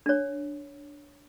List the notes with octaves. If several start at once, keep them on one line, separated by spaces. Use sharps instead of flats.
D4 C#5